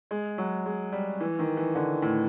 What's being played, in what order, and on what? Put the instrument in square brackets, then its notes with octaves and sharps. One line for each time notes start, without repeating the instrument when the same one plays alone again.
[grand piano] G#3
F#3
G#3
G3
E3
D#3
E3
D3
A2